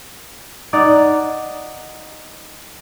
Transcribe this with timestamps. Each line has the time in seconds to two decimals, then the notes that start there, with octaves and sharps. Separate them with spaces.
0.73 D#4 D5 F#5